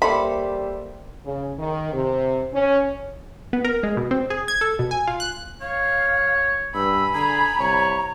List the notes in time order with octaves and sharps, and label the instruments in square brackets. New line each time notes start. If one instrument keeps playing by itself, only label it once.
[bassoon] G3 [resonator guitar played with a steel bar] A#3 A4 C5 [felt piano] E5 C6 [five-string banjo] B5
[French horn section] C#3
D#3
C3
C#4
[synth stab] B3
A#4
G#3
B2
C4
G#4
G#6
A4
B2
G#5
F4
F#6
[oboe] C#5 [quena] F5
[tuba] G2 [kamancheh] G#5 B5 [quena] E6
[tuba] D3 [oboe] G#4 [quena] A#5
[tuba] C2 [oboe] C#5